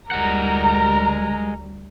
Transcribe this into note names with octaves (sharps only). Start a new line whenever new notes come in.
D2 G3 G#3 A#4 F#5 A#5